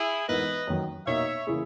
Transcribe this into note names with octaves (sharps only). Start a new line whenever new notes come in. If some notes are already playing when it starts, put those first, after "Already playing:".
Already playing: E4 G#4
G#2 E3 B3 D#4 A#4 B4 D#5
F#2 D#3 F#3
B2 A#3 D#4 C#5 E5
C#3 E3 A#3 E4 G#4